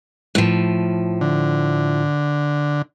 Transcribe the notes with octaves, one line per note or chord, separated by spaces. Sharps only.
A2 F3
D3